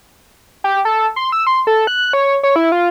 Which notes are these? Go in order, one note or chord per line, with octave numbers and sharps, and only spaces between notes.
G4
A4
C6
E6
C6
A4
F#6
C#5
C#5
E4
F4